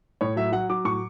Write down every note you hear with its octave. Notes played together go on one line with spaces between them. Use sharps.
A2 C#5
F#3 E5
F#3 F#5
F#3 D6
A2 C#6